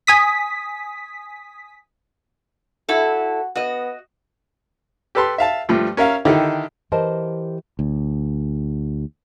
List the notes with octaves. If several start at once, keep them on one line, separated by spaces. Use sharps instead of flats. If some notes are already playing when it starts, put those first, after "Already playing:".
G#5 D#6 B6
E4 F#4 A4
B3 F#4 D#5
G4 A4 B4 A5 C6
E5 F5 A5
G2 F3 A3
C#4 A#4 E5 F5
D3 D#3 D#4 E4 G4 A4
E3 G4 A#4 C5 D#5 A5
D2